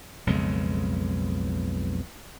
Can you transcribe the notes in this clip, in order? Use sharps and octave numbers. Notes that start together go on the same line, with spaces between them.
B1 F2 C#3 G#3